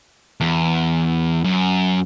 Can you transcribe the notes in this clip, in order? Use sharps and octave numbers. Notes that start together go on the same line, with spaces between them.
E2
F#2